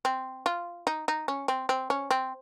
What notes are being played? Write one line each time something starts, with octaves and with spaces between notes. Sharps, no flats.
C4
F4
D#4
D#4
C#4
C4
C4
C#4
C4